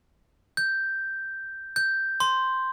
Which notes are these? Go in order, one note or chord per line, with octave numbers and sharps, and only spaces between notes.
G6
G6
C6